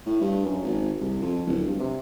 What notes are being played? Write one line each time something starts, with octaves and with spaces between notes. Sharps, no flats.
A2
G2
F#2
G#1
C2
F2
D1
G2
C3